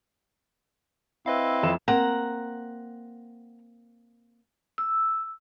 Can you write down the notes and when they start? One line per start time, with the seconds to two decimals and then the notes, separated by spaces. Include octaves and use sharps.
1.26 C4 E4 B4 D#5 F5
1.63 F2 E5 E7
1.88 A#3 C4 F#5 A#5
4.78 E6